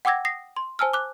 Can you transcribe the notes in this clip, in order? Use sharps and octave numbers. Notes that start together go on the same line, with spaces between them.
F#5 G5 D6 E6 G#6 A#6
D#6 A#6 C7
C6
C5 G#5 A5 E6 F6
D6 F#6